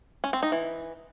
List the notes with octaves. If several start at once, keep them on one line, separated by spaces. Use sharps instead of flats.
C#4
C4
D#4
E3